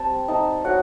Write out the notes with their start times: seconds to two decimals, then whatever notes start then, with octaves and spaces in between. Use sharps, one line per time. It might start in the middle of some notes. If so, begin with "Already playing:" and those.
Already playing: G3 C4 G5 A5
0.28 D#4 A5
0.64 F#3 F#5